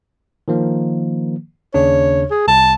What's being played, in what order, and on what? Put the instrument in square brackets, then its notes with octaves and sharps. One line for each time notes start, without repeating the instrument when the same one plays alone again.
[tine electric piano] D#3 F3 A#3
[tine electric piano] D#2 C#3 D4 [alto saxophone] C#5
[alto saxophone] G#4
[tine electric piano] C2 [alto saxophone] A5